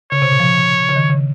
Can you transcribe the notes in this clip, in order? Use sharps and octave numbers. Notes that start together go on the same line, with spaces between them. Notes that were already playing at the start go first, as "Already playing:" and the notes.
C#3 C#5
C3
A#2
F3
C#3
D#3
C#3